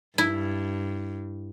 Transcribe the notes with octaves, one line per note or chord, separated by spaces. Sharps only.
G2 E4